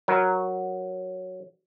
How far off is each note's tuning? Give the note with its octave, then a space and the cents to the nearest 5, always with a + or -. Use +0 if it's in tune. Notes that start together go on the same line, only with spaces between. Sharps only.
F#3 +0 A#4 +0